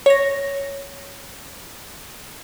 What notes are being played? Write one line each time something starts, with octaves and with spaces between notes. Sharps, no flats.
C#5 A#6